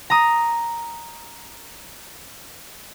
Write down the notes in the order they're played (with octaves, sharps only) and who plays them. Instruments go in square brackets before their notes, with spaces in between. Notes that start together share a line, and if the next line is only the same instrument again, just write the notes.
[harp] A#5 D#6